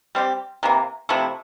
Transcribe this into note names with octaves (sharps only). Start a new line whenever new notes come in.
G3 C4 G4
C3 E3 A#3
C3 F3 A3 E4